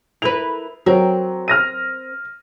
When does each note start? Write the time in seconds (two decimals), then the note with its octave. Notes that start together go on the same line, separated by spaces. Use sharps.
0.22 E4 A#4 B4 F7
0.86 F#3 C4 A#4
1.48 F6 A#6 D#7